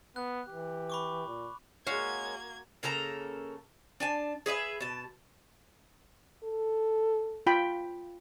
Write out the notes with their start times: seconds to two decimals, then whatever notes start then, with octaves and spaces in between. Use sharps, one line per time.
0.16 B3 F#6
0.49 E3 G4
0.90 B5 C#6 D6
1.27 A#2
1.87 G#3 A#3 C#4 F#4 F5 G#6
2.83 C#3 A#3 A4 A#5
4.00 D4 G#5 A5
4.46 G#4 B4 D#5 E5
4.81 B2 A5
6.44 A4
7.46 F4 G5 B5